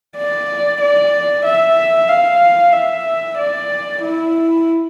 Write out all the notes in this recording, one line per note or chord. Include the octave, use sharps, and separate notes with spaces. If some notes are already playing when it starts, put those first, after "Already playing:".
D5
D5
E5
F5
E5
D5
E4